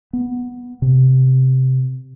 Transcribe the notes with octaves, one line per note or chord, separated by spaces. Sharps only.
B3
C3